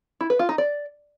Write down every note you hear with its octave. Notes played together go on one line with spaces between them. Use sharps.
E4
B4
F4
D#4
D5